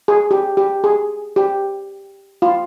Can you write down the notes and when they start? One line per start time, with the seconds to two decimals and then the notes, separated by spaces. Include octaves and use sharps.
0.08 G#4
0.31 G4
0.57 G4
0.84 G#4
1.36 G4
2.42 F4